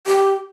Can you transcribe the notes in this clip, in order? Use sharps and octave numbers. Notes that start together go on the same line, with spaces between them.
G4